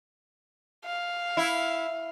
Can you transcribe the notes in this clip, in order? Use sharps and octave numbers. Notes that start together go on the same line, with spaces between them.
F5
E4